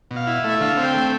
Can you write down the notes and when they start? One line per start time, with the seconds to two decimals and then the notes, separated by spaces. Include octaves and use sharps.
0.11 B2
0.16 F5
0.27 E4
0.44 A3
0.50 E5
0.61 D3 F5
0.77 C4
0.83 G5
0.94 A3